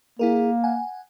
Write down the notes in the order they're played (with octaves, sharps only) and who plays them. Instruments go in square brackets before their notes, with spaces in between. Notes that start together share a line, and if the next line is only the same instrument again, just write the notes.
[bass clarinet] A#3 [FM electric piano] E4 G#4 A#4
[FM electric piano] F#5 G#5